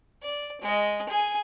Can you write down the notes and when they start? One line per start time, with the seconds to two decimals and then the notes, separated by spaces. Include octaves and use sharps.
0.23 D5
0.61 G#3 D#5
1.09 G#4 G#5